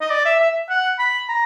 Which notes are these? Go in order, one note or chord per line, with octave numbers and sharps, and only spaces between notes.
D#5
D5
E5
E5
F#5
B5
A#5